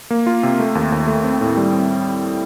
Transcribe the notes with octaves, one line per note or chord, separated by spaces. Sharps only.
A#3
F4
C3
A3
D#2
D#2
A3
C4
A2
G3
C4